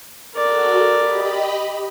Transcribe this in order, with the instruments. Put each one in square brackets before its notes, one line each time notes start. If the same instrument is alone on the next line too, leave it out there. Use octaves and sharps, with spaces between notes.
[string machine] F#4 A4 [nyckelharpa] A#4 D5
[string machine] G4 D#5 B5